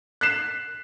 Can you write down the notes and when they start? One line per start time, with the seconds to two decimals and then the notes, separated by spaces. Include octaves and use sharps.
0.21 F#6 B6 C7 E7